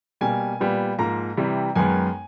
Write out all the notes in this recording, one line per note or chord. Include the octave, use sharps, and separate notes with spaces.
B2 G3 A#3 G#5
A#2 G3 B3
G#2 F3 A#3 A#5
C3 E3 G3
F#2 D#3 G#3 B3 G#5